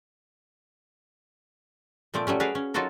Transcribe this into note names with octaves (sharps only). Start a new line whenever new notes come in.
A#2 F3 A3 C4 D5
F#3 G3 A3 C#4
F#4 G#4 B4 C#5 D5 F5
C#4
F#3 D#4 F4 F#4 A4 A#4